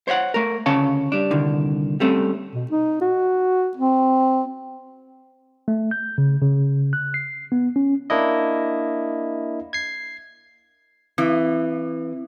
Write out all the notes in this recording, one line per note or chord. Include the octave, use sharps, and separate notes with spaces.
C5 C#5 E5 F#5
A3 A#4
D2 C#3 C#4 C#5 F5 A5
G3 D4
C2 D3 D#3
G3 A3 C4 C#4
B2
D#4
F#4
C4
A3
G6
C#3
C#3
F#6
C7
B3
C#4
A#3 D4 E4 D#5
G#6 C7
E3 C4